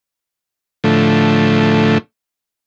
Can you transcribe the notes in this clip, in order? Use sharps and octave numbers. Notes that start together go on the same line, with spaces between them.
A2 D3 F3 A3